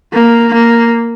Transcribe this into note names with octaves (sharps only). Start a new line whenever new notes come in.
A#3
A#3